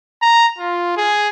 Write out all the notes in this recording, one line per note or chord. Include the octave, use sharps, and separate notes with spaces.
A#5
F4
G#4